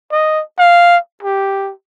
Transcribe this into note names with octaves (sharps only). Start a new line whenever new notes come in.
D#5
F5
G4